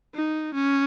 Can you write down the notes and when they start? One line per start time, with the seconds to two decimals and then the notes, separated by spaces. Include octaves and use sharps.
0.15 D#4
0.54 C#4